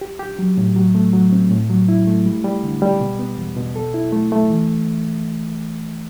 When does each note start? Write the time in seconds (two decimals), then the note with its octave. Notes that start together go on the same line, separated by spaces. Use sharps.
0.01 G4
0.19 G4
0.39 F#3
0.57 A2
0.76 F#3
0.95 A3
1.13 F#3
1.32 C4
1.51 A2
1.70 F#3
1.89 E4
2.07 A3
2.26 G3
2.44 G3
2.64 D3
2.82 G3
3.01 B2
3.19 B3
3.37 E2
3.56 B2
3.76 A4
3.94 E4
4.13 A3
4.32 A3
4.50 E3